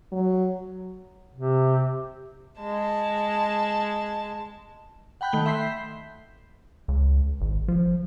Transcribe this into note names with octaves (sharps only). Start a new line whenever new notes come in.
F#3
C3
G#3 A5
F#5 G5 B5 F#6 G6
D#3 A3 G7
E5 B5 C6 G6 B6 C7
C#2
G#1
F3